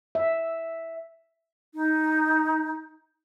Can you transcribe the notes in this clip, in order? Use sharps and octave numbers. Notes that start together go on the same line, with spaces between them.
E5
D#4